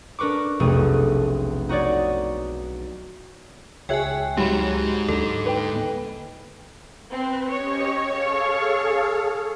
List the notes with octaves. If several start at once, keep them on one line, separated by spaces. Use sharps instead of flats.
D4 A#4 B4 C#6 D6
F1 B1 A3 G#4 D#7
D#4 F#4 C#5 D5
C#2 G#4 C#5 E5 G5 G#5 F#6
G#2 F#3 G4 B5
D#2 D3 A4
B4 G5
C4 B4
C#4 G4 C#5 D#5
G#4 A4 F5